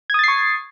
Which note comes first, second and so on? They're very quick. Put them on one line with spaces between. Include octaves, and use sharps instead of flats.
G#6 D#6 A6 C7 C#6